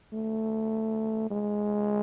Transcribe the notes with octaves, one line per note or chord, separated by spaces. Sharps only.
A3
G#3